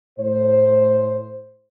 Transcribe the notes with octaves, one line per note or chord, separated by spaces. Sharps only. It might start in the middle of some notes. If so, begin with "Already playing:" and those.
A2 C5